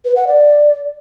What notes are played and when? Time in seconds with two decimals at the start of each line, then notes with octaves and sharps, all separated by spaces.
0.05 B4
0.16 F#5
0.27 D5